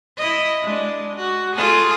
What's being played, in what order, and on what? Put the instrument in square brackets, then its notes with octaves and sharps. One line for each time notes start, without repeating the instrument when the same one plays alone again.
[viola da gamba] E4 D#5
G#3 D4
F#4
F4 G#4 A4